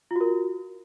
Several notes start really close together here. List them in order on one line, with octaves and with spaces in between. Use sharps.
F4 F#4 A#4